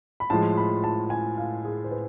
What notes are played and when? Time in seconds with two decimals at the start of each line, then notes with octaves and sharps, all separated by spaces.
0.20 B5
0.30 A2 F3 G#3 A5
0.57 B5
0.84 A5
1.10 G#5
1.38 F5
1.65 G#4
1.84 C5
1.91 B4